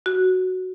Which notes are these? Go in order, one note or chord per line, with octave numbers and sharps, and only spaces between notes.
F#4